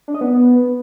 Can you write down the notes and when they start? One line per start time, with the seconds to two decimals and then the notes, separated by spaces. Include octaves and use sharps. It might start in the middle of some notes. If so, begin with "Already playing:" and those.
0.08 D4
0.14 D#5
0.21 B3